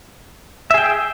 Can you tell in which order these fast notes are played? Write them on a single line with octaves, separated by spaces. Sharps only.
E5 G#4 G5